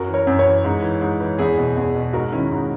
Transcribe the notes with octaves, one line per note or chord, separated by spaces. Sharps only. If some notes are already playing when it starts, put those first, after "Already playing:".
Already playing: F#2 F#4 A#4
E3
A#4 C#5
F#2
A#4 C#5
E3
G#2
E3
G#2
E3
E2 E4 G#4
B2
E2
B2
G#2 F#4 A#4
D#3 C#4 E4
G#2 D#4